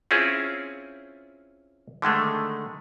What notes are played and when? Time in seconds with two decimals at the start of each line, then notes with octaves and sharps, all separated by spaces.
0.11 C4 C#4 E4 F4 G#4
2.02 D3 D#3 G#3 A3